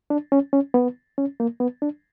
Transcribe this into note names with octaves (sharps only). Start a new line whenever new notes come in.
D4
C#4
C#4
B3
C#4
A#3
B3
D4